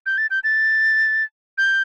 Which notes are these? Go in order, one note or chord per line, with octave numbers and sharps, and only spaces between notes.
G6
A6
G6
A6
G6